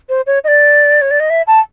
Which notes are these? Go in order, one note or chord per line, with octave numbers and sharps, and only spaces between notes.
C5
C#5
D#5
D5
C#5
D5
D#5
E5
A5